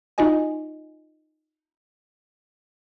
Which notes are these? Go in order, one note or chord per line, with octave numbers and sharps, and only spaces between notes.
D#4 F4 F#4 D#5 G#5